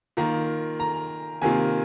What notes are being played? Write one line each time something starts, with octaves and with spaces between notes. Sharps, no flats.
D#3 A#3 F4 A#5
A#5
C3 D#3 A#3 F4 G#5